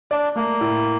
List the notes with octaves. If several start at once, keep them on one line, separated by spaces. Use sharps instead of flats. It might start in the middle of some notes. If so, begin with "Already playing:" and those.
D4 D5
A3 A#3
A2